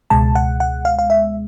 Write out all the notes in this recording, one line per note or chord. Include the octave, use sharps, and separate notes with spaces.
C#2 B2 G#3 A5
F#5
F#5
F5
F5
E5